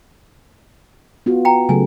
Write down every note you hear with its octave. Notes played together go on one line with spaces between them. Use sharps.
B3 F4 F#4
G5 A#5
C#3 F#3 A3 G#5